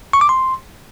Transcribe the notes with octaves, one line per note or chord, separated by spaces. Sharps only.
C#6
D6
C6